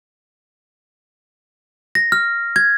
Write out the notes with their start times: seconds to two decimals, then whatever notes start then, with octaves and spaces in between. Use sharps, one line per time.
1.95 A#6
2.12 F6
2.56 G#6